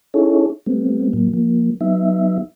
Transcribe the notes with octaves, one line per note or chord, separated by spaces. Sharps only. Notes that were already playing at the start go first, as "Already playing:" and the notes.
C#4 D#4 E4 G#4 A4 C#5
G3 A3 B3 C4
A2 F#3 A#3
F3 A#3
F#3 B3 D#4 E5